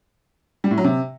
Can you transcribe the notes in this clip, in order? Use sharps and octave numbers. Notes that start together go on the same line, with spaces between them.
G3
A2
F#3
C3